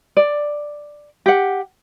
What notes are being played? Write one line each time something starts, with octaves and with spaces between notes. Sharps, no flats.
D5
G4 F#5